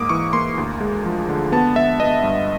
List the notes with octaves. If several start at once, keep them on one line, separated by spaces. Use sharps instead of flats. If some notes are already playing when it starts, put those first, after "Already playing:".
Already playing: G#2 A#3 D6 D#6
E3 C#6
A#3 C6
D2
G#3
F3
D3
B3 A5
B3 E5
B3 D#5
G2